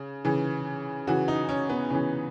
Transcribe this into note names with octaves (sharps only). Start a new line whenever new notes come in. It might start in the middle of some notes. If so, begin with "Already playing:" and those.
Already playing: C#3
C#3 E3
C#3 E3 F#4
D#4
C#4
B3
C#3 E3 C#4